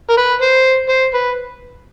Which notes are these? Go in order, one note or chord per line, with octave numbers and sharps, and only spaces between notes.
A#4
B4
C5
C5
B4